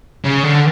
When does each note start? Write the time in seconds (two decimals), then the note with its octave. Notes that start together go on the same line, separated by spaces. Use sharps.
0.25 C#3
0.44 D3